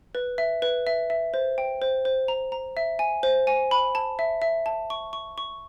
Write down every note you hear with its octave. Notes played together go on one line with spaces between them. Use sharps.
B4
E5
B4
E5
E5
C5
G5
C5
C5
A#5
A#5
E5
G#5
C5
G#5
B5
A5
E5
E5
A5
C#6
C#6
C#6